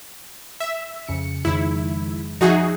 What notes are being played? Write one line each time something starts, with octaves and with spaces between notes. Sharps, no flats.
E5
F2 C#3 C#7
F2 D#3 G#3 E4
F3 D#4 F#4 G#4 E5